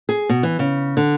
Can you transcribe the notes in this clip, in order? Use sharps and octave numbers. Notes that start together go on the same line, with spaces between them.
G#4
B2
E3
C#3
D3